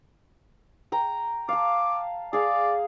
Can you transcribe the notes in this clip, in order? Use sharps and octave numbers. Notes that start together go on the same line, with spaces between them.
G5 A#5
F5 A5 D6
G#4 D5 F5